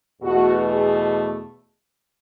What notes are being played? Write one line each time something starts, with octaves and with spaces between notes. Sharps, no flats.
E2 B2 A3 F#4
G#4